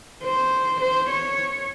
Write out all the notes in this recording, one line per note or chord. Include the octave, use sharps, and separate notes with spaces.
C5
C5
C#5